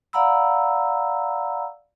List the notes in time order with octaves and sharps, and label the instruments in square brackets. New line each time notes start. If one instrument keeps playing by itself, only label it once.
[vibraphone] D5 F5 F#5 A#5 B5 E6